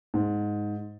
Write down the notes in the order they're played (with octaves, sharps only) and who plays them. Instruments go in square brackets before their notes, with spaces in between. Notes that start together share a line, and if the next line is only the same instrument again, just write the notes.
[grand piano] G#2